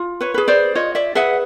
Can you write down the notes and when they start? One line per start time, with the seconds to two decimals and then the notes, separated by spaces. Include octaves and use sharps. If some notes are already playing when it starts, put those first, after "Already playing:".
Already playing: F4
0.21 B4 C#5
0.34 G#4 B4
0.48 C5 D5
0.75 F4 C#5 D#5
0.95 D5 E5
1.15 G#4 B4 E5 F#5